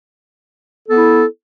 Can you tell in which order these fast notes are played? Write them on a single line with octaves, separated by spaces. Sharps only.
A4 B3 E4